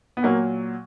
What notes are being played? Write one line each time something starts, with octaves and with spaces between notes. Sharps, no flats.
B3
A#2 F#3 A#3